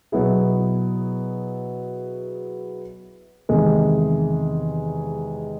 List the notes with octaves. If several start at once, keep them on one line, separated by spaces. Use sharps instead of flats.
B2 F#3 B3 E4 G#4
E2 C3 D#3 G#3